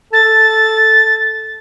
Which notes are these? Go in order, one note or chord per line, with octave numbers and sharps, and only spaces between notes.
A4 A6